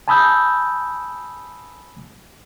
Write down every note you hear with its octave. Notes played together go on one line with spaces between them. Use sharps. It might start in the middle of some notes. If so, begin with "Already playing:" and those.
G#5 A5 B5 D#6 E6 G6